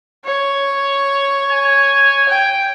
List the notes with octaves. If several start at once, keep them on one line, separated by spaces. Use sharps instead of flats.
C#5
G#5
G5